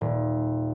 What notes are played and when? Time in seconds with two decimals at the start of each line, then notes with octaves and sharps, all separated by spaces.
0.01 D#1